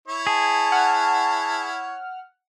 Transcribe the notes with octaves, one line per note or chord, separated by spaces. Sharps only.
E4 C#5
G#4 A5
F#5 F6